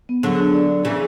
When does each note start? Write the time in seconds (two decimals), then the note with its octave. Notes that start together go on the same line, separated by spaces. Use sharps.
0.09 B3
0.23 D3 F#3 G#4
0.38 D4
0.54 D5
0.70 B3
0.84 C#3 E3 G#4